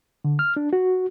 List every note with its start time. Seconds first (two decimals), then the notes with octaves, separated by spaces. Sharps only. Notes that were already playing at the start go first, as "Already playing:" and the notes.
0.25 D3
0.39 F6
0.57 D4
0.73 F#4